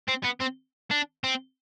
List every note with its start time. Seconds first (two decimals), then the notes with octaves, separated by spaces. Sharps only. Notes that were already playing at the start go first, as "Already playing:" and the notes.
0.09 C4
0.25 B3
0.41 C4
0.91 D4
1.24 C4